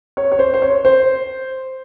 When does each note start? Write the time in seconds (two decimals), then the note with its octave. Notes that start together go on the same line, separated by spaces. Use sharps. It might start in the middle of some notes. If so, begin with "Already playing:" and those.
0.17 C#5
0.32 C#5
0.39 C5
0.54 C5
0.62 C#5
0.85 C5